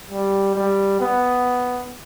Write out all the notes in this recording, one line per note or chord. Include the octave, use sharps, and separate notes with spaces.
G3
G3
B3